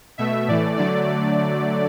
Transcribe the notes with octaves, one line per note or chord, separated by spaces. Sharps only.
B2 A3 E5
A2 E3 A3 D5
D3 F#3 A3 D5